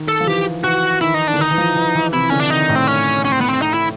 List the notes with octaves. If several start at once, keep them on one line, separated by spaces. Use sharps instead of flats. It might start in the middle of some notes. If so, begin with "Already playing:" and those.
Already playing: D#3
A4
F3
E3 G4
E3 F#4
D#3 E4
D#4
D4
D3
D#3
D#4
E3
F3
E3
E3
C3 E4
D3 C#4
D4
D#3 D#4
A2
C4
C#4
C#4
C4
B3
C4
D#4
E4